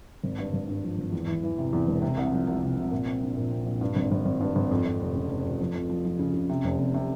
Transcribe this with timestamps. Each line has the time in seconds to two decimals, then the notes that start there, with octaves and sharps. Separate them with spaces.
0.23 G#1
0.38 G2
0.53 G#1
0.68 G2
0.84 F3
0.98 G#1
1.12 E2
1.27 E3
1.43 E3
1.58 C3
1.73 E2
1.87 E1
2.02 C3
2.17 C2
2.32 F3
2.48 C2
2.63 C3
2.77 C3
2.91 A#2
3.06 C4
3.21 A#1
3.37 A#2
3.51 C4
3.66 A#1
3.81 G2
3.96 G#1
4.11 G#1
4.26 G#1
4.41 G2
4.56 G#1
4.71 F2
4.85 F2
5.01 F1
5.15 C#3
5.30 F1
5.44 F2
5.60 F3
5.75 F2
5.89 F3
6.05 F3
6.19 C#3
6.34 C#3
6.49 C3
6.64 F1
6.78 F1
6.94 C3